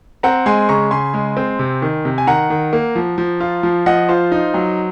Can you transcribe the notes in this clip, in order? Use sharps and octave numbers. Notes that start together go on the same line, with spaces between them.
C4 F#5 A#5
G#3 G#5 C6
C#3 A#5 C#6
C#3 G#5 C6
G#3
C4
C3
D#3
C3
G#5
D#3 F#5 A#5
D#3
A#3
F3
F3
F4
F3
F3 D#5 F#5
F4 C5
D#4
F#3